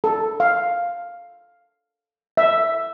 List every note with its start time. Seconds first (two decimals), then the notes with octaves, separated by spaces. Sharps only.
0.04 A4
0.40 F5
2.37 E5